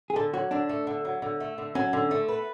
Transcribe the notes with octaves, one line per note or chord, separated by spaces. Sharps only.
G#4
D3 A4
F#3 F#4
D3 D4
A3
D3
F#3
D3
A3
D3
F#3 C#4
D3
A3
B4